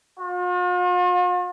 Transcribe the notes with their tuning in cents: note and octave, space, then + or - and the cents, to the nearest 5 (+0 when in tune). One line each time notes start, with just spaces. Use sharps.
F4 +45